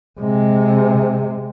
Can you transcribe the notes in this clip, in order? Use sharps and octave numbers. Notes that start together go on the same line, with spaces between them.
C3 G#3